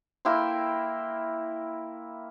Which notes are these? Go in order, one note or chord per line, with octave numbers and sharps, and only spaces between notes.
A#3 E4 G5 C6